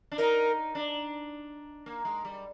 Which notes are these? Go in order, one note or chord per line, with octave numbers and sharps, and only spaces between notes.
D4
D#4 A#4
D4
A#3
G#3
G3